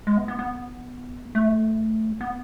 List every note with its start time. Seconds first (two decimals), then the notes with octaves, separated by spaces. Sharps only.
0.07 G#3
0.17 B3
0.28 B3
0.39 B3
1.35 A3
2.21 B3